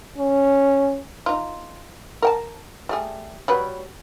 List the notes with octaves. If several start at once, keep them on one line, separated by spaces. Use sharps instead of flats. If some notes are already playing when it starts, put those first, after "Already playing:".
C#4
D#4 F4
A#4 G5 A5
G3 A3 G#4
F#3 G3 B4